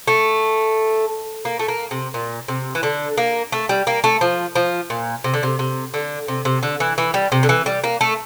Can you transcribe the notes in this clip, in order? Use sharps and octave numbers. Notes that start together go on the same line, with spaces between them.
A3
A#3
A3
A#3
C3
A#2
C3
E3
D3
A#3
A3
G3
A#3
A3
F3
F3
A#2
C3
D3
C3
C3
D3
C3
C3
D3
E3
E3
G3
C3
D3
E3
G3
A#3
A3